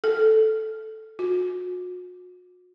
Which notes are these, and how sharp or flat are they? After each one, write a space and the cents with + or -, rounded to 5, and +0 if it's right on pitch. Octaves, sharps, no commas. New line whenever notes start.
A4 -5
F#4 -40